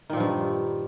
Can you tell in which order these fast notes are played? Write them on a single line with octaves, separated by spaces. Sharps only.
D#3 A#2 F3 G2